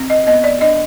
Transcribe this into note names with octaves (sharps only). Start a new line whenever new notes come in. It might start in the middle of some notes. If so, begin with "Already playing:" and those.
Already playing: C4
D#5
B3 D#5
D5
D4 D#5